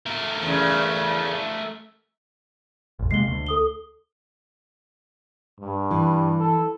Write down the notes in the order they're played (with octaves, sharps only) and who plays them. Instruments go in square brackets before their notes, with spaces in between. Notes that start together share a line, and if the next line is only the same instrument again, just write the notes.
[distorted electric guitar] A3 A#4
[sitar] E2 C#3
[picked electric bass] A1 E2
[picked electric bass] C3 G#3 A#3 [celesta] C7 G7
[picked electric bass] D2
[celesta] A4 D#6 G7
[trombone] G2
[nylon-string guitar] E3
[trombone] A4